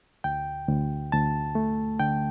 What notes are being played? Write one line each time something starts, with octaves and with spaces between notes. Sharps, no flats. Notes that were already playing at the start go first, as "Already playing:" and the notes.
D2 G5
D2
D2 A5
A3
D3 G5